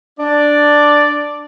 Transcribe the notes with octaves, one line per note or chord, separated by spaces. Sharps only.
D4 D5